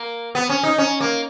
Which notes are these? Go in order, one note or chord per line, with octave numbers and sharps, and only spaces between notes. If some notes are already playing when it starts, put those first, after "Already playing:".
Already playing: A#3
B3
C#4
D#4
C#4
A#3